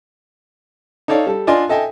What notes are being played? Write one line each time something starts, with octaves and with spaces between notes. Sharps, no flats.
D#4 A4 C#5 D5 F5
G3 A4
D4 F4 D5 D#5 G#5 C6
A4 D#5 E5 G5 G#5